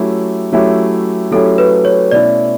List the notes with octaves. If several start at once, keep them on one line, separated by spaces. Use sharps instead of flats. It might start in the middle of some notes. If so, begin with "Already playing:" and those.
Already playing: F#3 A3 C#4 E4 G4
F#3 A3 C#4 E4 G4
F#3 A3 C#4 E4 G4 A4
B4
C#5
B2 A3 C#4 E4 D5